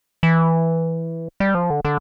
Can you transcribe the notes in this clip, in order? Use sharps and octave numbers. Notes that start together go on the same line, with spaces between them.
E3
G3
F3
D3
D3